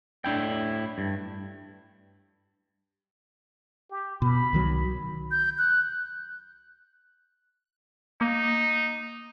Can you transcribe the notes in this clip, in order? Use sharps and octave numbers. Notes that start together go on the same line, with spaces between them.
A2 D4 E4 G5
G2
G4
B2 B5
C2 D#3 F#3
G6
F#6
A#3 D#4